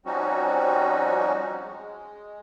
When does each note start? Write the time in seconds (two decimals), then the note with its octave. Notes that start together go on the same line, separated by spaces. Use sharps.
0.06 F3 G3 C4 C#4 D#4 F#4
1.64 G#3